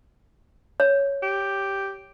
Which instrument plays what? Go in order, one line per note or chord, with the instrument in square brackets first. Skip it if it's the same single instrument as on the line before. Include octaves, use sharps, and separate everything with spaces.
[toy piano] C#5
[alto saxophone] G4